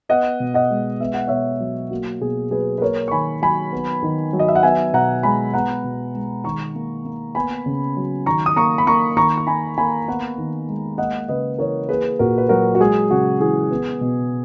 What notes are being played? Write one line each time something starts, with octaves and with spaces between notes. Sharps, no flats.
B3 D#5 F#5
B2
D#5 F#5
G#3
B3 E5
F#5
B2 C#5 E5
F#3
A#3 F#4
B2 G#4
F#3 G#4 B4
B4
A#3 A#4 C#5
C#6
D#3 G#5 B5
F#3 G#5 B5
B3
D#3
F#3
D#5
E5
F#5
B3 E5 G#5
B2 F#5 A#5
G#3 G#5 B5
B3 F#5 A#5
B2
G#3
D#3 A#5 C#6
A#3
A#3
B3 G#5 B5
C#3
F#3
D#3 A#5 C#6
D#6
A#3 A#5 C#6
B5
A#3 A#5 C#6
D#3 A#5 C#6
C#6
A#3 G#5 B5
A#3 G#5 B5
B3 F#5 A#5
D#3
G#3
A#3 D#5 F#5
C#3 B4 D#5
E3 A#4 C#5
A#3 G#4 B4
A#2 F#4 A#4
B4
F#3 F#4 A#4
F#4
G#3 G#4
C#3 F#4
E3 G#4
B3
B2